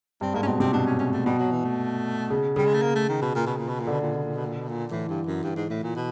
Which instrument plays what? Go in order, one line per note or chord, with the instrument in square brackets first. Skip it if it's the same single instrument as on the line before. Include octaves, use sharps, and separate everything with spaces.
[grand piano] G2 [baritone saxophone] C4
[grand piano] G#2 [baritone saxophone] A#3
[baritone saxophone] C#4
[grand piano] B2 [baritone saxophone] C4
[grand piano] C3 [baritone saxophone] C4
[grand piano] B2 [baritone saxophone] D4
[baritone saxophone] C#4
C#4
A3
[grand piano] B2 [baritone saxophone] G3
[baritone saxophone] F#3
E3
A3
[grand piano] C#3
[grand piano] C#3 [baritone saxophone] G3
[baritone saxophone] G#3
A3
A#3
A3
D#3
B2
A#2
B2
A#2
B2
A#2
[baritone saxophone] B2 [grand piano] D3
[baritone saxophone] A#2
B2
A#2
B2
A#2
B2
A#2
[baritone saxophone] A2 [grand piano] E3
[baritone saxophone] G2
F#2
G2
G#2
A2
A#2
B2